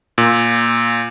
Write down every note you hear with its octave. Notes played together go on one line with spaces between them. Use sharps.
A#2